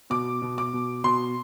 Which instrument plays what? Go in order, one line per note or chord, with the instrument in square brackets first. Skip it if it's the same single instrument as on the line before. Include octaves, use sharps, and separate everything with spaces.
[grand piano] B2 D6
B2
D6
B2
B2 C6